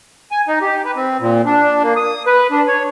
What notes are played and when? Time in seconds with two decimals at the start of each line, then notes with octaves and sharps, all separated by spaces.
0.31 G#5
0.48 D#4
0.61 G4
0.84 B4
0.96 C4
1.20 A#2
1.46 D4
1.83 A#3
1.96 D#6
2.27 B4
2.51 D4
2.68 C#5